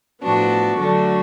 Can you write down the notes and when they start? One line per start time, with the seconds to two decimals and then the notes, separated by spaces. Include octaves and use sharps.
0.21 A2 F3 B3 D4 F#4
0.77 D3 F#3 A3 D4 F#4